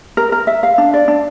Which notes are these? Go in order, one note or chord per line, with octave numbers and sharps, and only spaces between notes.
A#4
A#4
E5
F5
D4
D5
D4